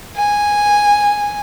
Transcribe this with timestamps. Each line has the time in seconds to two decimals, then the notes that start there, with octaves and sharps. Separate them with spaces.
0.16 G#5